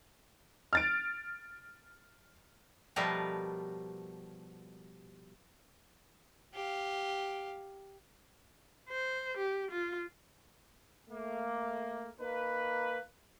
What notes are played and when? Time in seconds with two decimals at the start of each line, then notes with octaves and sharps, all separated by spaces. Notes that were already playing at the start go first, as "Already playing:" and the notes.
0.73 F6 A6 D7
2.96 B2 F3 G3 A3 A#4 B4
6.54 G4 F5
8.89 C5
9.37 G4
9.71 F4
11.09 A3 A#3
12.19 A#3 D#4 B4